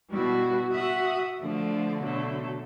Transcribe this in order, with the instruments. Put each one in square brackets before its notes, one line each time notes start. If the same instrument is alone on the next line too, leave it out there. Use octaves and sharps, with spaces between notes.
[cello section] B2 G3 E4 [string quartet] F#4
[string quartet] F#4 F#5 D#6 [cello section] E5
[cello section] D3 [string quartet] F3 A3 D4
[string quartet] B2 F#3 A3